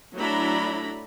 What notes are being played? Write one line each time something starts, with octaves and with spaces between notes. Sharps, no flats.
F#3 A3 D4 E4 A#5 B5